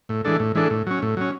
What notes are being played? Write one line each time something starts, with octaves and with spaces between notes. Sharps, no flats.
A2
E3 G#3 D4 A4
A2
E3 G#3 D4 A4
A2
F#3 C#4
A2
F#3 C#4